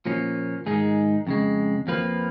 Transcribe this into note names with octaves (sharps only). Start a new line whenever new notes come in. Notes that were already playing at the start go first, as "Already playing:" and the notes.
A#2 F3 A#3 C#4
G#2 D#3 G#3 D#4 G#4
F2 C#3 G#3
F2 F3 A#3 F4 B4